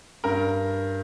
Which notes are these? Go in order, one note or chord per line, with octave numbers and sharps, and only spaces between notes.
G2 A#4